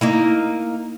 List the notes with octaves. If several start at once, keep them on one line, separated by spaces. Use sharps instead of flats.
A#3 D#4 E4